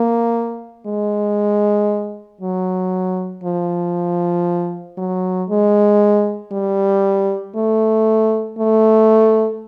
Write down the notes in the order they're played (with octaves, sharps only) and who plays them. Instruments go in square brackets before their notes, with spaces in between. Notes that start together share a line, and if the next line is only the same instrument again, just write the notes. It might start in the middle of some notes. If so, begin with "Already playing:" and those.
Already playing: [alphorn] A#3
G#3
F#3
F3
F#3
G#3
G3
A3
A3